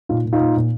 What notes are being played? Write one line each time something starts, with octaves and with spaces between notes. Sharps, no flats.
A#2 D#4 F4
A#2
D#4 F4
A#2
A#2